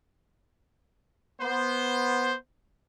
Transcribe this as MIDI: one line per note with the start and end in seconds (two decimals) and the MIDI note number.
1.41 2.34 59
1.41 2.34 72